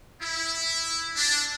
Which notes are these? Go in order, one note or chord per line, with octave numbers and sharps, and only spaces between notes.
E4
D4